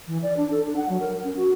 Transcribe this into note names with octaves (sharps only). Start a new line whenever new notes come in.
E3
D5
D4
A4
D4
F#5
F#3
A#4
C#4
F#4